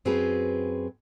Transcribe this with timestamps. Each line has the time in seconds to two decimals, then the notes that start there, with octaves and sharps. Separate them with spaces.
0.05 F#2 C4 F#4 G#4 B4 A#5